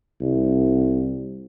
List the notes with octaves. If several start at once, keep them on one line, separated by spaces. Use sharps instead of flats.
C2